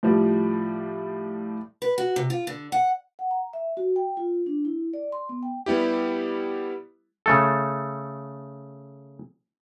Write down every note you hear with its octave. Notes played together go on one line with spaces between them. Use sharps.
A2 F3 G3
B4
F#4
C3
F4
D3
F#5
F#5
A#5
E5
F#4
G5
F4
D4
E4
D5
C6
B3
G5
G3 B3 E4 G4
C#3 A3 A4